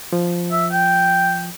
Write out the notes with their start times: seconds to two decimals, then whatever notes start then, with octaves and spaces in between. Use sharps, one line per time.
0.13 F3
0.51 E5
0.72 G5